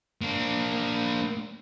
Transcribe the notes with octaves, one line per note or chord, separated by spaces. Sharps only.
A#3 D4